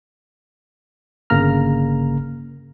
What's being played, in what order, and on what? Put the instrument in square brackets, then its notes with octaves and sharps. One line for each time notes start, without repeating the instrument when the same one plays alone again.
[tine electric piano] G1 C#3 A#3 A#5 F6